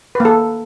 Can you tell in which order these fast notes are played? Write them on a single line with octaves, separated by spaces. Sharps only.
B4 A#3 A4